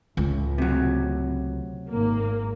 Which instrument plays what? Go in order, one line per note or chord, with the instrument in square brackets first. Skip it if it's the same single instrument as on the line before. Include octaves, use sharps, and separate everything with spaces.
[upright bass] C#2 [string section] A2
[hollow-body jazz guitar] C3 F#3
[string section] G#1 A#3